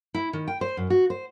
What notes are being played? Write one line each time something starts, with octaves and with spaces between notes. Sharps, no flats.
E4
D#3
G5
C5
F#2
F#4
C5